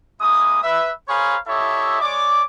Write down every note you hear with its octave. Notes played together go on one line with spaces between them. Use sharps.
G#3 A#3 E4 D#6
B4 E5
G#4 A#4 C5 C#5 F5 B5
E4 G4 A4 C#5 D#5 E5
G#3 C#5 D5 D6